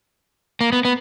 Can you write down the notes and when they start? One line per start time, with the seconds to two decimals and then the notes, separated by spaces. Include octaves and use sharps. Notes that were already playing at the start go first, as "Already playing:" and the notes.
0.61 A#3
0.72 B3
0.85 B3